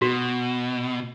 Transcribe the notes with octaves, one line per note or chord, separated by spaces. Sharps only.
B2 F#4